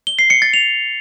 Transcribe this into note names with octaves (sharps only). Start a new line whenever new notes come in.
G7
C7
C#7
A6
F7